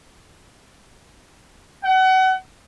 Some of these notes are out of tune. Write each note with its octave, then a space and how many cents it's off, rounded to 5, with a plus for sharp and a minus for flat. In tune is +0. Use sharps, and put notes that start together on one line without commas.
F#5 +30